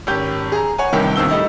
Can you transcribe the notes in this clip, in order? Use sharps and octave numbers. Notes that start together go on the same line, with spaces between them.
G#1 C#4 G4 G6
G#4 A#5
C#5 F#5 G#5
G1 G2 C3 D#3 G5
D1 D#2 B2 C4 E6 G7
G3 A3 D#4 E4